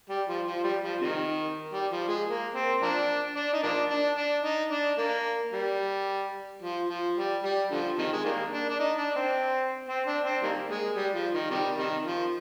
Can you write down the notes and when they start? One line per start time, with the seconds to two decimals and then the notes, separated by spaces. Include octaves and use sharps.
0.10 G3
0.28 F3
0.47 F3
0.64 G3
0.83 F3
1.01 C3 D#3
1.74 G3
1.92 F3
2.09 G#3
2.28 A#3
2.54 C4
2.82 F3 A#3 D4
3.36 D4
3.53 D#4
3.64 F3 A#3 D4
3.91 D4
4.18 D4
4.45 D#4
4.72 D4
4.99 A#3
5.54 G3
6.63 F3
6.90 F3
7.17 G3
7.44 G3
7.71 D3 F3
7.98 C3 D#3
8.14 G#3
8.25 D#3 G3 A#3
8.52 D4
8.69 D4
8.79 D#4
8.98 D4
9.16 C4
9.88 C4
10.07 D4
10.25 C4
10.43 D#3 G3 A#3
10.70 G#3
10.97 G3
11.15 F3
11.34 D#3
11.51 C3 D#3 G3
11.78 C3 D#3
12.06 F3